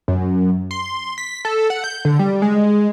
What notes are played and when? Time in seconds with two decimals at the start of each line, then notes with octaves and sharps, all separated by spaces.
0.08 F#2
0.71 C6
1.18 B6
1.45 A4
1.70 F#5
1.84 G6
2.05 D3
2.19 G3
2.42 G#3